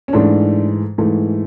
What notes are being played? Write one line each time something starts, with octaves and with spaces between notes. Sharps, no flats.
C#4
G#2 E3 A3 D4
G#2 E3 A3